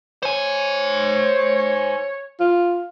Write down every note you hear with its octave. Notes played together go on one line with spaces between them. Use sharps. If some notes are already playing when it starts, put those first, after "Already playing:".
C5 C#5 G#5
F4